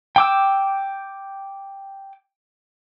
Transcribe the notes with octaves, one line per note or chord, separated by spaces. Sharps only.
G5 D6 E6